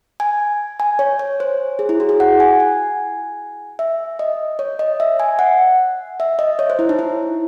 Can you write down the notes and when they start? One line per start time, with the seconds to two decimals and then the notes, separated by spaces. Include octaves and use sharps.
0.20 G#5
0.80 G#5
0.99 C#5
1.19 C#5
1.40 C5
1.79 G#4
1.89 E4
2.00 F#4
2.09 G#4
2.20 F#5
2.40 G#5
2.60 G#5
3.79 E5
4.19 D#5
4.59 C#5
4.79 D#5
5.00 E5
5.20 G#5
5.39 F#5
6.20 E5
6.39 D#5
6.59 C#5
6.70 C5
6.79 E4
6.89 D#4
6.99 E4